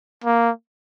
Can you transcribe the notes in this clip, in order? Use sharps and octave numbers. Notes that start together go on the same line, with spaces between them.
A#3